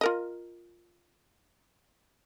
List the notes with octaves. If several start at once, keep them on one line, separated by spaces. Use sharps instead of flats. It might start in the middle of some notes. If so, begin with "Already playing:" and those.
F4 A#4 D#5